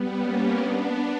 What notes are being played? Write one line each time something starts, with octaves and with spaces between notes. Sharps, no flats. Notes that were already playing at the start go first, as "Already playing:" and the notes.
Already playing: G3 B3
A#3 C#4
B3 D4